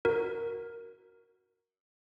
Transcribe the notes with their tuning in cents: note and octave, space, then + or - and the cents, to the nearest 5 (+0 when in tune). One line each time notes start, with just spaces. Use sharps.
F#4 +0 A#4 +0